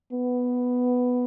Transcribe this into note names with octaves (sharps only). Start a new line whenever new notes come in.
B3